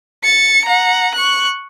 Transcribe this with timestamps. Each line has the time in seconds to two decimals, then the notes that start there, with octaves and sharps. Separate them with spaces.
0.23 A6 C#7
0.64 F#5 A#5
1.15 C#6 F#6